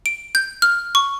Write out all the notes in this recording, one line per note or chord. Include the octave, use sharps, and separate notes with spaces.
D7
G6
F6
C#6